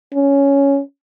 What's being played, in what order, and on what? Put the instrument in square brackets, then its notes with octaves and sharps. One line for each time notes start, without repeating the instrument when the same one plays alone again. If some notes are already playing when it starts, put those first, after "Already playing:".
[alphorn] C#4